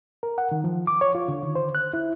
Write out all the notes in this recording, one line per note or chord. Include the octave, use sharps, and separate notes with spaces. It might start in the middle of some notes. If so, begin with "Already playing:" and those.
A#4
F#5
D#3
F3
D6
C#5
F4
D3
D#3
C5
F#6
E4